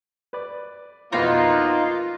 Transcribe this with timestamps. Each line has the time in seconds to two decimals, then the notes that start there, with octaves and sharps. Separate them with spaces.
0.33 B4 D5
1.12 F2 B2 E3 A#3 B3 D#4 F4